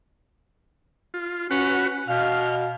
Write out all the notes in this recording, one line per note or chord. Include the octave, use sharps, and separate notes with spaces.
F4
C#4 F#4 B4 F#5
B2 F5 F6